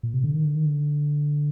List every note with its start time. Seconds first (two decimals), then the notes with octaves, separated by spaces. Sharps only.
0.03 A#2
0.14 C3
0.24 D3
0.34 D#3
0.45 D3
0.55 D#3
0.66 D3